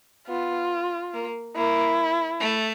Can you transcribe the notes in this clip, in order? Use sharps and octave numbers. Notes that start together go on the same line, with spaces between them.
B3 F4
A#3
A#3 E4
A3